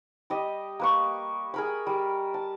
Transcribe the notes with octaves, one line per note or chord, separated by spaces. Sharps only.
G3 G4 D#5
A#3 B4 C#6
G#4 A#4 B5
G3
A5